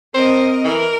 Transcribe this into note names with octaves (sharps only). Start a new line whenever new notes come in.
C4 A#4 C5 D#5
E3 A#4